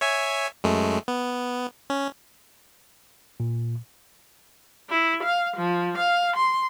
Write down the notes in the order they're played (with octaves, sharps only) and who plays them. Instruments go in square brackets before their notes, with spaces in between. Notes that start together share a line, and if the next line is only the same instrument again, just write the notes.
[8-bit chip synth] C#5 E5 G#5
F#2 G#3 A3
B3
C#4
[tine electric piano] A#2
[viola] E4
F5
F3
F5
C6